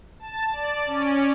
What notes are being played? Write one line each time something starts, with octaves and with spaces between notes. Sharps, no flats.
A5
D5
C#4